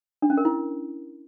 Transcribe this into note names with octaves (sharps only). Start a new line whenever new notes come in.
D4
C#4
A#4
E4